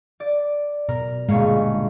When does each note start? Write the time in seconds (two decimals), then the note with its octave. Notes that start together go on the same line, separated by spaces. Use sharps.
0.20 D5
0.89 B2 A#4
1.29 G1 A#2 G#3 C#5 F5